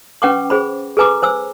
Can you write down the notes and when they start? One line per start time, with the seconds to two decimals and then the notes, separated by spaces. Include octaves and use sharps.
0.22 C#4 B4 F#5 G5 C#6 D6
0.50 G#4 C5 B5
0.97 G#4 A4 B4 G#5 A#5 D6
1.22 C5 G#5 E6